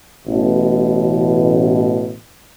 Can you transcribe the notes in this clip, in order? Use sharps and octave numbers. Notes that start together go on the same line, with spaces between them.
A1 B2